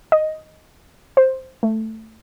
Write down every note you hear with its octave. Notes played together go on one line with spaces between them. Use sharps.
D#5
C5
A3